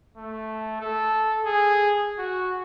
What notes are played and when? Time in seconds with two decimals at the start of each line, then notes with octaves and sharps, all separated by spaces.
0.17 A3
0.81 A4
1.45 G#4
2.18 F#4